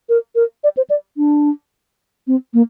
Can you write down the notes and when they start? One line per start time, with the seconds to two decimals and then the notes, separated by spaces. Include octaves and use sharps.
0.09 A#4
0.35 A#4
0.64 D5
0.77 C5
0.90 D5
1.17 D4
2.27 C4
2.54 A#3